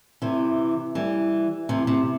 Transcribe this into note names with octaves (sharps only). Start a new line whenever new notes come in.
C3 E3
E3 G3
C3 E3
C3